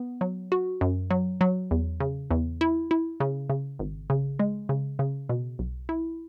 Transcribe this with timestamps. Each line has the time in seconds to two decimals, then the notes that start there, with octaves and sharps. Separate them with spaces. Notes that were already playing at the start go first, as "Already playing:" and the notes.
Already playing: B3
0.21 F#3
0.52 F#4
0.81 F#2
1.11 F#3
1.41 F#3
1.71 E2
2.00 C#3
2.31 E2
2.61 E4
2.91 E4
3.20 C#3
3.50 C#3
3.79 G#1
4.10 C#3
4.39 G#3
4.69 C#3
4.99 C#3
5.29 B2
5.59 B1
5.89 E4